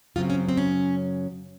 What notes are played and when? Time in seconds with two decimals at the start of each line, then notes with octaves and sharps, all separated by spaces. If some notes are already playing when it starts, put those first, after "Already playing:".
0.16 F#2 C#3 F#3 C4 F4
0.30 C#4
0.49 C4
0.57 C#4